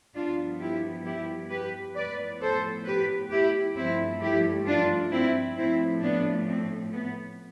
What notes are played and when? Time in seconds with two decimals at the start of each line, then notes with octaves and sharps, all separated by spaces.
0.15 G2 F3 B3 D4 F4
0.60 E4 G4
1.05 E4 G4
1.50 G4 B4
1.95 A2 F3 B3 B4 D5
2.41 A4 C5
2.86 G4 B4
3.31 E4 G4
3.76 G2 F3 A3 C4 E4
4.21 E4 G4
4.67 D4 F4
5.12 C4 E4
5.57 A2 F3 A3 C4 E4
6.02 B3 D4
6.48 C4
6.92 B3